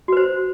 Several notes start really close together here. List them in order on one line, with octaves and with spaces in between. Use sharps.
F#4 B4 C5